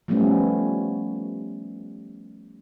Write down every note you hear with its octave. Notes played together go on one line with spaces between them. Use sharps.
F3 G3 A3 B3 C#4